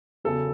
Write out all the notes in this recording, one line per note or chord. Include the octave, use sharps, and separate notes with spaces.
E2 C#3 F#3 A4